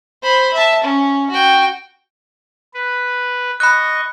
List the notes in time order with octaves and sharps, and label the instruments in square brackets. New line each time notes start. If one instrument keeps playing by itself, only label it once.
[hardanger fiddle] C5 B5
E5 A5
C#4
F#4 G5
[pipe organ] B4
[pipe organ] D#5 C#6 [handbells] B5 F#6